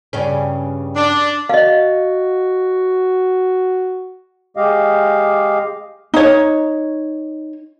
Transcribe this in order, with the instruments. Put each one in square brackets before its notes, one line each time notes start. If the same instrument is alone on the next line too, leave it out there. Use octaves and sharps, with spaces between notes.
[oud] G2 C#3 C#4
[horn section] D4
[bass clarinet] F#4 [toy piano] D#5 F5
[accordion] G#3 G4 D#5 F5
[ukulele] D#4 C#5